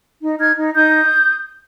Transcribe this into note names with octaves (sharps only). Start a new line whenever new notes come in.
D#4
D#4 F6 G#6
D#4
D#4 D#6 G6